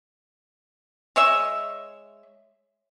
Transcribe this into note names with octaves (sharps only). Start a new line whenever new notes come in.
G#3 C#5 E5